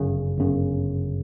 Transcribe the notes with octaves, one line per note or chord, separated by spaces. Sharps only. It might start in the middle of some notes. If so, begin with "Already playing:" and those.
Already playing: G1 F#2 C#3
G1 F#2 C#3